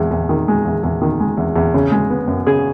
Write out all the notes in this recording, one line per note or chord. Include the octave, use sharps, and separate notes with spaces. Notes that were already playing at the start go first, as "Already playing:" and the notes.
Already playing: E2 G#3
E2
D#3
G#3
E2
E2
D#3
G#3
E2
E2
C#3
G#3
B3
F#2
C#3 G#4